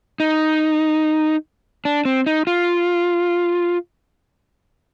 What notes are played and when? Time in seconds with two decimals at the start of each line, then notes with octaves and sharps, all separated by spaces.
0.20 D#4
1.85 D4
2.05 C4
2.26 D#4
2.47 F4